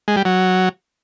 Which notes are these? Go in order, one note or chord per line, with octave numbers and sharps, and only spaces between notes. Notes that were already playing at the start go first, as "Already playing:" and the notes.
G#3
G3
F#3